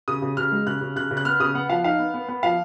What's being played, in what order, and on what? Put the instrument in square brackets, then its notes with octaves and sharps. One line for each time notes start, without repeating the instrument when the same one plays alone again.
[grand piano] C#3 D#6
C#3
C#3 F6
G#3
C#3 F#6
C#3
C#3 F#6
C#3
F#6
B3 F6
C#3 D#6
B3 F#5
F3 F5
D#4 F5
B3
B3
B3
F3 F5